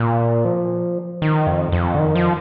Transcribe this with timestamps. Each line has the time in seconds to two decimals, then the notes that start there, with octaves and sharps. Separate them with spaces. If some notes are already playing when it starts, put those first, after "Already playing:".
Already playing: A#2
0.45 F3
1.22 D#3
1.47 F2
1.72 F2
1.94 D3
1.99 D#3
2.15 F3